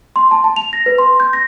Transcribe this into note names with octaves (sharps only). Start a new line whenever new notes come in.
C6
A5
A5
F7
A#6
B4
C6
G6
A#6